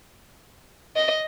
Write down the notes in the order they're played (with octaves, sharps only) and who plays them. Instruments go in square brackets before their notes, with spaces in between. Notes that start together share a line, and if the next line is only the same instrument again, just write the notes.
[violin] D#5